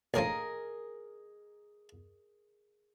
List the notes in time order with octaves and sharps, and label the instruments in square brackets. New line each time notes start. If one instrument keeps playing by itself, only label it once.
[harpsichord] A#1 A2 F3 [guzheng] G#4 A#4 D#5